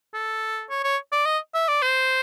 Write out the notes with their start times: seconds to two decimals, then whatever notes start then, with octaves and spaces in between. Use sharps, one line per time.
0.14 A4
0.70 C#5
0.84 C#5
1.12 D5
1.25 D#5
1.54 E5
1.68 D5
1.82 C5